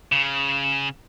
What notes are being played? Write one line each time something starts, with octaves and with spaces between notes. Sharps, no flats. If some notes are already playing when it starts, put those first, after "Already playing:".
C#3